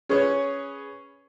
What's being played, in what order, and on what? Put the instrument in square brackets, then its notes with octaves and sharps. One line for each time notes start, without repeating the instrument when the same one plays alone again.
[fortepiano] C#4 G#4 B4 C#5